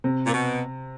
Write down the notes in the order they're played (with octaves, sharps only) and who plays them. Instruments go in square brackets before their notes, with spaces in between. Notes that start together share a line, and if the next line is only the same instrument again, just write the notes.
[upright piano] C3
[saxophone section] A#2
B2